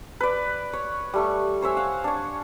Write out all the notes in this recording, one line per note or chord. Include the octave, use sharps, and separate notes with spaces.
B4 D5
C#5
G3 A3 C#6
C5 C#5 E5 G#5
F5 F#5
D4 C#5